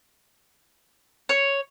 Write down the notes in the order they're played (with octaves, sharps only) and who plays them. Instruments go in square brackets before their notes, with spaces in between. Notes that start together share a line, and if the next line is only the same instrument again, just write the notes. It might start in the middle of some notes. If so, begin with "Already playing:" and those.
[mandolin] C#5